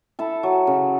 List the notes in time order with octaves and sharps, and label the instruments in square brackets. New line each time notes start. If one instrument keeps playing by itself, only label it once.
[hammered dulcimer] E4 A4 A5
F#3
C#3